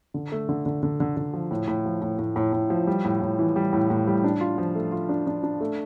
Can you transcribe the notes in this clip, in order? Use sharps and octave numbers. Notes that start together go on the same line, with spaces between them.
D3
A3
D3
D3
D3
D3
D3
F3
A2
A2
F3
A2
A2
A2
A2
F3
G3
A2
A2
E3
G3
A2
A2
G3
D4
F4
F3
A3
F4
D4
D4
D4
A3